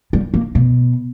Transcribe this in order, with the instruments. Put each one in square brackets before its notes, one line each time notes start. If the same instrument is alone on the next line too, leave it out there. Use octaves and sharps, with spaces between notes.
[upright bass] G3
A#3
B2